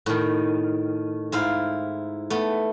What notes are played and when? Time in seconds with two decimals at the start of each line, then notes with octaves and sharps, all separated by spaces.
0.06 A2 D#3
1.32 G#2 E4 F5
2.30 A3 B3